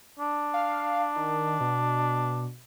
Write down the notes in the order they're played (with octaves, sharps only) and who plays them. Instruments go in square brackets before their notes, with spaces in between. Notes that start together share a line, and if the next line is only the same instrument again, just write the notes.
[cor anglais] D4
[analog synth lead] F5
D#3
B2